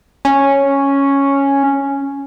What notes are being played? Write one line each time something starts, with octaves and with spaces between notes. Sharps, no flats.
C#4